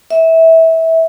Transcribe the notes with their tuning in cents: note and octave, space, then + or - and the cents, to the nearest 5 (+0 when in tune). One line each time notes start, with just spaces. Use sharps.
E5 -20